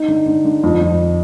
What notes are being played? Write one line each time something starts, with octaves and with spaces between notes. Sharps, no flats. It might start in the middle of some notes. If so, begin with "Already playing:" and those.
Already playing: D#4
D3
D3
D3
F2
F2